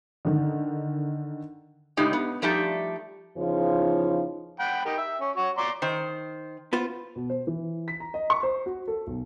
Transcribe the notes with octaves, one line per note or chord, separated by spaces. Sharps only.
D3 D#3
A2 C#3 G#3 D#4 G4
B3
F3 G3 A3 D#4 G4 A4
E2 C#3 F3 D#4 F4 C#5
F#5 G5 B5
D#4 G4 A#4
E5
C#4
F#4 C#5
D5 A#5 C6
D#3 C5
B3 F4 C5
B2
C5
E3
B6
A#5
D#5
C#6
C5
F#4
A4
B1